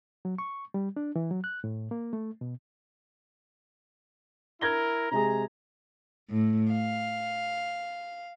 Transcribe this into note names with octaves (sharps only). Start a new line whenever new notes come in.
F#3
C#6
G3
D4
E3
F#3
F#6
A2
A#3
A3
B2
E4 A#4 G#6 A#6 G7
C3 G#3 G#4 A#5
A2
F5